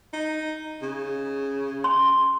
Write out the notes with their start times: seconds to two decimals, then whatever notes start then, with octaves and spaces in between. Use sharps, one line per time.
0.13 D#4
0.82 C#3
1.84 C6